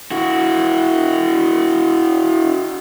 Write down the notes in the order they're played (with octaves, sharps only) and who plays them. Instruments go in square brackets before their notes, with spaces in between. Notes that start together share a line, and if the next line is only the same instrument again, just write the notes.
[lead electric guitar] E4 F#4